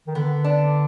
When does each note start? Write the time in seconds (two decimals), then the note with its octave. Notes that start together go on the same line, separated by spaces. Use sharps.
0.07 D#3
0.15 D3 B3
0.44 D4